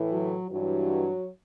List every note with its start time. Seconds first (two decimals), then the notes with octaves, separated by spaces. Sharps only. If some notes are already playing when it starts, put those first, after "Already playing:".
Already playing: A2 E3
0.12 F#3
0.50 G2 E3 F#3